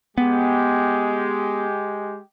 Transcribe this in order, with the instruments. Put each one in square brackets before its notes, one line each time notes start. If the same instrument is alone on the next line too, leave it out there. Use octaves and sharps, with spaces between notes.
[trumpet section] G#3 G4 [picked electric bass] B3